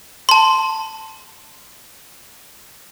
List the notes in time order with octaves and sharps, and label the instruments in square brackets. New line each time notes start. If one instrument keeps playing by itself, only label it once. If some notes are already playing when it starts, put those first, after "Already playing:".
[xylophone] A5 C6